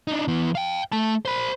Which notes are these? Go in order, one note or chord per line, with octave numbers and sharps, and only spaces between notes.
D4 D#4
E3 B3
F5 G5
A3 A5
C5 B5